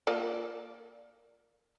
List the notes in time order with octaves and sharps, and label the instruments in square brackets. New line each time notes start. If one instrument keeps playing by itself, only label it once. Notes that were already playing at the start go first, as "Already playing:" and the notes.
[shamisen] A#3 F4 D5